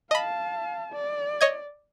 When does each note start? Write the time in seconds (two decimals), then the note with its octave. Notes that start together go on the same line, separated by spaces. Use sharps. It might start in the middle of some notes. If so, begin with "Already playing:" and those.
0.11 D#5 F5 A5 B5
0.93 D5
1.41 C#5 D#5 G#6